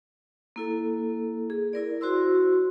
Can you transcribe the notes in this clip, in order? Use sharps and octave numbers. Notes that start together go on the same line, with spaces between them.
A#3 E4 A4
G#4
E4 A#4 D5
E4 F#4 C5 C6 E6